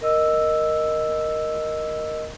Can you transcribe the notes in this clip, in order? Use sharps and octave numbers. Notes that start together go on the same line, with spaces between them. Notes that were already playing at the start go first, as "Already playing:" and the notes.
A#4 D#5 E6